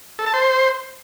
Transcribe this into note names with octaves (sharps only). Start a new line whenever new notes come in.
A4
A5
C5